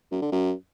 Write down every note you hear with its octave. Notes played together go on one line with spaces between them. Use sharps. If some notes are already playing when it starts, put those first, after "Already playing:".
F#2
D3
F#2